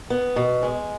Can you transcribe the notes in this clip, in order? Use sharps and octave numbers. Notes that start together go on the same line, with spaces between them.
B3
B2
G#3